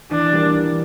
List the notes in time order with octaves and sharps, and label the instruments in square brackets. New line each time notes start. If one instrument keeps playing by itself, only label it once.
[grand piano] E3 [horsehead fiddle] D4
[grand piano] G3 A#3
E3